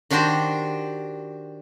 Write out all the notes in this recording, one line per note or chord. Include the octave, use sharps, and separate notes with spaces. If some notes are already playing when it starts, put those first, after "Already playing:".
D#3 D4 F#4 G4 C5